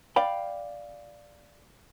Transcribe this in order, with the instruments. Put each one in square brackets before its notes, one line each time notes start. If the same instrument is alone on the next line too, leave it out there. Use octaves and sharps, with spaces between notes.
[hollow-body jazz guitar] D5 F5 G5 B5